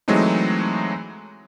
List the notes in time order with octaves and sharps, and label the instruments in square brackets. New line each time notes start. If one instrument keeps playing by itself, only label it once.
[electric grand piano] E3 F#3 G#3 A3 C4 D#4